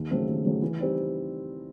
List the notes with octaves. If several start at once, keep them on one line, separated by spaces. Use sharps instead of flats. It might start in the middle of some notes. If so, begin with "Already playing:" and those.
Already playing: D#2
C#3 F#3 A3 C4
D#2
C#3 F#3 A3 C4
E3
G3 C4 D#4